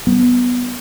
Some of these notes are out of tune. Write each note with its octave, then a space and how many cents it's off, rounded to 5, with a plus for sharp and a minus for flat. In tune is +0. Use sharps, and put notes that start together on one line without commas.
G3 -35 B3 +0